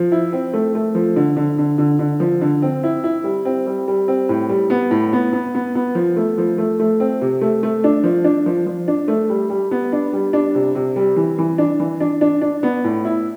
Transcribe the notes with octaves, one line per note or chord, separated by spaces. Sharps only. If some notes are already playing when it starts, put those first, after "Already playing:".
Already playing: F3
E4
C4
A3
A3
F3
D3
D3
D3
D3
D3
F3
D3
C4
E4
E4
G3
C4
G3
G3
C4
A2
G3
B3
A2
B3
B3
B3
B3
F3
A3
F3
A3
A3
C4
C3
A3
A3
D4
F3
D4
F3
F3
D4
A3
G3
G3
B3
D4
G3
D4
C3
C3
G3
E3
E3
D4
E3
D4
D4
D4
B3
A2
E4